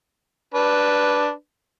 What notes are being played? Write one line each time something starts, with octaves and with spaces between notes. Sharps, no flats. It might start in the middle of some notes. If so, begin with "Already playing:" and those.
D4 B4